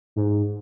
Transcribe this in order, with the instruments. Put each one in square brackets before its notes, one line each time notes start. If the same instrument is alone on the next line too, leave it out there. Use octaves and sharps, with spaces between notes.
[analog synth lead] G#2